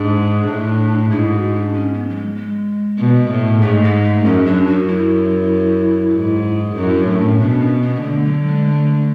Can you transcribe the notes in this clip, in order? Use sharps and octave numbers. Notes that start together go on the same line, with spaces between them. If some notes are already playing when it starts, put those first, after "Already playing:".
Already playing: G#2 D4
A2
G#2 E4
F#4
D4
C#4
B3
F#3
G#3
G#3
B2
A2
G#2 A3
G#3
A3
F#2 C#4
D4
F#2
F#4
E4
G#2
F#2 E4
D4
A2
C#4
B2 D4
C#4
B3
D3 A3
F#3
G#3
A3